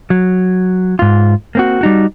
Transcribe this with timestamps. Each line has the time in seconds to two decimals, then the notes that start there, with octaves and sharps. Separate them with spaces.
0.10 F#3
0.99 G#2 F4
1.55 A#3 C4 F#4
1.81 G3 D#4 F#4